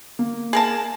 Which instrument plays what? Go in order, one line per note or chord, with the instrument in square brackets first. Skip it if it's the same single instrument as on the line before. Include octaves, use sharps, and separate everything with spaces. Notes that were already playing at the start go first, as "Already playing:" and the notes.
[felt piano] A#3
[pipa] G#4 A#4 A5